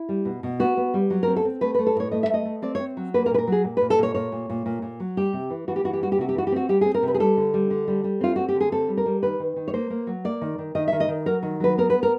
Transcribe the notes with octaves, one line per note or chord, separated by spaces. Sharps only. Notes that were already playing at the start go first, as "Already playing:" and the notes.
Already playing: E4
G3
B2
B2
B3 F#4
B3
G3
F#3
A#4
C4
A4
C4
A3 B4
B4
A3
A4
A2 C#5
A3 D#5
E5
A3 D#5
A3
C4 D5
C#5
C4
F#3
A#3 B4
A#4
A#2 B4
A#4
F#3 G#4
A#2
B4
A#2
A4
A#2 C#5
A#2 C#5
A#2
A#2
A#2
A#2
F#3
G3 G4
C3
E3
E3 F#4
G4
E3 F#4
G4
G3 F#4
G4
C3 F#4
G4
E3 F#4
G4
C4 F#4
G3 G4
G#4
C4
A#4
C3
B4
G#4
G3 A4
D3
G3
D3
G3
G3
C4 F4
C4 F#4
G4
D3
G#4
C4 A4
G3
A#4
G3
D#3 B4
D#3
D#3
C#5
A#3 C5
A#3
F#3
A#3 D5
D#3
D#3
D#3 D#5
E5
D#3
D#5
D#3
F#3 A#4
D#3
F#3 B4
B3 A#4
B3 B4
A#4